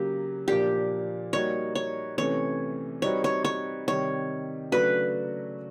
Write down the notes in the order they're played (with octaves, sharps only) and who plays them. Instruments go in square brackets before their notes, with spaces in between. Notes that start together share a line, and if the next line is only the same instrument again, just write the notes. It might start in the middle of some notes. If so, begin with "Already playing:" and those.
Already playing: [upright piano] C#3 F#3 A#3 [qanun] G4
[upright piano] A#2 F3 A#3 D4 [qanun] G4
[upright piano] G3 A#3 D#4 F#4 [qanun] C#5
[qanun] C#5
[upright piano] C3 E3 A3 C#4 [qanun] C#5
[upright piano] G3 C4 D#4 F#4 B4 [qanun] C#5
[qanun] C#5
C#5
[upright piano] C3 D#3 G3 [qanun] C#5
[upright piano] C#3 F#3 A3 D4 F#4 [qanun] B4